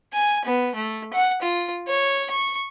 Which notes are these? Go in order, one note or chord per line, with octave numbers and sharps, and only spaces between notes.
G#5
B3
A3
F#5
F4
C#5
C#6